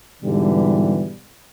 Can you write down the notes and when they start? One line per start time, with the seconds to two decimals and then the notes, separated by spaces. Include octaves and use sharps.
0.23 G#2 B2 D3 E3 G3